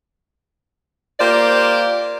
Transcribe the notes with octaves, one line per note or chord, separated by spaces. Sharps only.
A#3 F4 G4 C5 D5